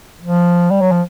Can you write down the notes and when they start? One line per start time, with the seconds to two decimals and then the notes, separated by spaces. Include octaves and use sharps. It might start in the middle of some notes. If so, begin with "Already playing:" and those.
0.22 F3
0.71 G3
0.82 F#3
0.92 F3